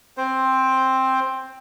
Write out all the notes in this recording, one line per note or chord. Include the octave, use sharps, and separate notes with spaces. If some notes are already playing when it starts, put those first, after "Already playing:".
C4 C5